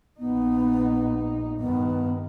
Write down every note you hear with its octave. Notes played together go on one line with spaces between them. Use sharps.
A#1 B3 D#4
G2 D#3 B3